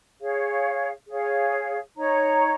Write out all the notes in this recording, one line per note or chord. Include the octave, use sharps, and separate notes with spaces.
G#4 C#5 F5
G#4 C#5 F5
D#4 C#5 A#5